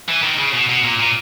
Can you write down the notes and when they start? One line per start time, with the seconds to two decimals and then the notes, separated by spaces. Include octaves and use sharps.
0.08 E3
0.23 D#3
0.38 C#3
0.53 B2
0.70 B2
0.84 A#2
0.99 A#2